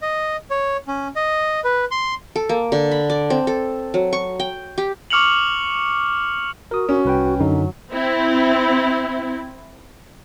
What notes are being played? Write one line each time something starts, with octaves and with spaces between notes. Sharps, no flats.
D#5
C#5
C#4
D#5
B4
C6
A4
A#3
D3
B5
D5
C4
A4
F#3
C#6
G5
G4
C#6 D6 F6 C#7 F7 F#7
F#4 A#4 D#6
C#4 F#4
C2 B4 G5
F#2 D3 F#3 D#4
C4 E4